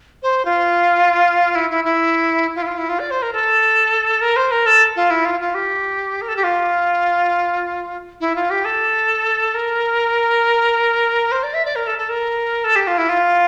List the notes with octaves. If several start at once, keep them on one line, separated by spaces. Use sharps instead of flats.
C5
F4
E4
E4
E4
F4
E4
F4
E4
F4
D5
C5
A#4
A4
A#4
C5
A#4
A4
F4
E4
F4
F4
G4
A#4
A4
G4
F4
E4
F4
G4
A4
A#4
C5
D5
E5
D5
A#4
A4
A4
A#4
A4
G4
F4
E4
F4